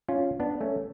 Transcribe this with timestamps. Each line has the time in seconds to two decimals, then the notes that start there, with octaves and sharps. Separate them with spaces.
0.08 C#4 F4
0.40 B3 D4
0.61 A3 C#4